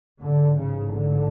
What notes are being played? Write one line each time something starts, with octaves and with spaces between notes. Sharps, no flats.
A1 G#2 D3
C#3
D3